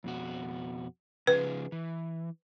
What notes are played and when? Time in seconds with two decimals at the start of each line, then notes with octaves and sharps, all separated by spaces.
0.04 F2 B2 F#4
1.27 C#3 F3 G#4 B4
1.72 E3